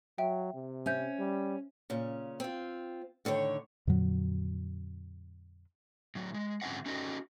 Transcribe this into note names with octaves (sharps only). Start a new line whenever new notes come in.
F#3 E5 G5
C3
C#4 C5 E5 G6
G3
A#2 C#3 C#4
C4 F4
A2 D3 D#3 C#5
F2 A#2 D3 F#3
A2 F#3
G#3
G#2 D3 C4 C#4 E5 F#5
C#4 D#4 F#4 A4 D#5